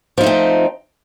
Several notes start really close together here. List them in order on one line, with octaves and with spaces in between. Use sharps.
F3 D#4 A3 C4